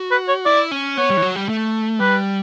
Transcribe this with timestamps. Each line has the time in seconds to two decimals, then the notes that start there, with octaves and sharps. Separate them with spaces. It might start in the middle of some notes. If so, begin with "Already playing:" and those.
Already playing: F#4
0.11 B4
0.28 C#5
0.45 E4 D5
0.71 C#4
0.97 B3 C#5
1.10 G3
1.17 E3
1.22 F#3
1.36 G3
1.49 A3
2.00 G3 B4